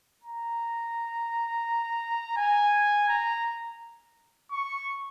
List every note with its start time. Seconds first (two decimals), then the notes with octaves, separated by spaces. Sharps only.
0.24 A#5
2.37 G#5
3.09 A#5
4.51 C#6